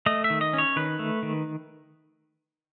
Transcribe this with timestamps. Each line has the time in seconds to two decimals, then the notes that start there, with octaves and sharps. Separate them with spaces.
0.06 A3 D#5
0.24 E5
0.30 D#3
0.41 D#5
0.53 C#4 C#5
0.76 D#3 B4
0.99 A3
1.23 D#3